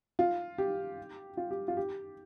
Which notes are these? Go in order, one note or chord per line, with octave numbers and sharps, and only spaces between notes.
F4
G4
F4
G4
F4
G4